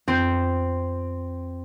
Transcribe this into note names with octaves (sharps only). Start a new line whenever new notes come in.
F2 C4 G6